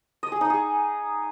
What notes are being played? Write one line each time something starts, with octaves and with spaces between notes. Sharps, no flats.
D#5
G#4
D#4
G#4